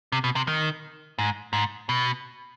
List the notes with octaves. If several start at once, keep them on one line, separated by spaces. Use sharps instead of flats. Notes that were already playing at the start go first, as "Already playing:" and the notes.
C3
B2
C3
D#3
G#2
G#2
B2